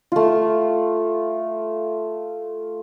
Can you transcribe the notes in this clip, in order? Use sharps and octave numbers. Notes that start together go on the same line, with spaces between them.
A3 F4